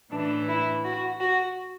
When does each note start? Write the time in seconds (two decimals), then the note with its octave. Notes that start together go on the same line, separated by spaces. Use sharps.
0.12 A2 E3 D4
0.49 E4
0.85 F#4
1.21 F#4